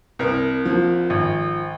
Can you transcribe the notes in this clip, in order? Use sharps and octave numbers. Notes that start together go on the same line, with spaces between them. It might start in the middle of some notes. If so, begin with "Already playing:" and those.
C2 A#4
F3
G#1